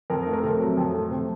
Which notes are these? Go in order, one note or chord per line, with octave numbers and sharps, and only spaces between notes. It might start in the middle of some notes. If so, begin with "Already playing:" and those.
F2 A#4
A3
A#4
C3 A4
F#3
F2
A3
C3 C5